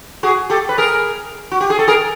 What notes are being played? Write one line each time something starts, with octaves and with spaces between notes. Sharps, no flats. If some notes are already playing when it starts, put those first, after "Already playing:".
F#4 G#4
G4 A4
B4
G#4 A#4
F#4
G4
G#4
A4
G#4 A#4